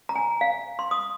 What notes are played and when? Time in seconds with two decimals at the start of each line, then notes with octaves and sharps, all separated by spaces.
0.09 A#5
0.16 G#5
0.41 F5
0.79 C6
0.91 D#6